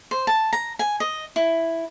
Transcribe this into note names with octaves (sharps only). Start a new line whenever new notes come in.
C5
A5
A#5
G#5
D#5
E4